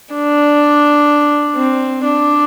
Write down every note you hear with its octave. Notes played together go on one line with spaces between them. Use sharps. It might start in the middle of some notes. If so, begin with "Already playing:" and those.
D4
C4
D4